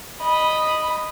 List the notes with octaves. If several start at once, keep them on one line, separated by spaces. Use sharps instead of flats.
D#5 B5